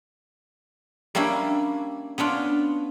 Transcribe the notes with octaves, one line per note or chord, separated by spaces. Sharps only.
G3 A#3 C#4 D4 E4
B3 C#4 D4 F4